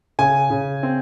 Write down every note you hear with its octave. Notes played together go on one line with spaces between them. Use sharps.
C#3 G#5
C#3
C4